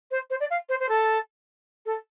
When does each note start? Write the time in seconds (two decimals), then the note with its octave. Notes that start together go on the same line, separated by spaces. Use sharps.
0.11 C5
0.30 C5
0.40 D5
0.50 F5
0.69 C5
0.80 C5
0.89 A4
1.86 A4